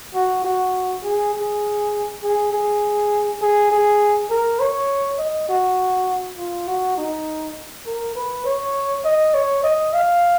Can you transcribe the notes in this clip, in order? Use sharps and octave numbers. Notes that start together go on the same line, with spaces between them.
F#4
F#4
G#4
G#4
G#4
G#4
G#4
G#4
A#4
C#5
D#5
F#4
F4
F#4
D#4
A#4
B4
C#5
D#5
C#5
D#5
F5